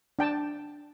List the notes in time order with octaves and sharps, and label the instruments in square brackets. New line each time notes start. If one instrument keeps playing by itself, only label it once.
[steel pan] D4 G5 A5